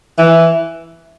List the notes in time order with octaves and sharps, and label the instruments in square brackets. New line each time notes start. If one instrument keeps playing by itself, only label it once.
[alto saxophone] E3